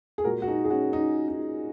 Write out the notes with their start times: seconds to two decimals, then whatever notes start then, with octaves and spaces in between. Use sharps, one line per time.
0.18 G#4
0.24 A#2 G#3 F#4 A#4
0.42 F#4
0.47 D#4 G#4
0.65 G#4
0.70 C#4 F#4
0.93 D#4
1.28 D#4